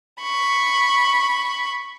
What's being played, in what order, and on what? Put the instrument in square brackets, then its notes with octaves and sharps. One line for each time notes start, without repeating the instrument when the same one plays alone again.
[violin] B5 C#6